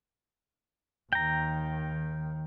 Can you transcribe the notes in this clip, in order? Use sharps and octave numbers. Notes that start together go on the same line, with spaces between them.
D#2 D#3 G5 A#5